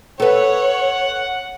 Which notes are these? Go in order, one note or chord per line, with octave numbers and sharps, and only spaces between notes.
A4 B4 C#5 F#5